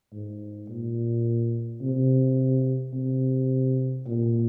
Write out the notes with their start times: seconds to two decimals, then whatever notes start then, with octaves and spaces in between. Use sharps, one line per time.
0.13 G#2
0.69 A#2
1.81 C3
2.94 C3
4.07 A#2